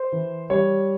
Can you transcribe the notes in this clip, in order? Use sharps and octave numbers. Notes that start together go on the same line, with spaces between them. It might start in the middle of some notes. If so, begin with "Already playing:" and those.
Already playing: C5
E3
G3 C#5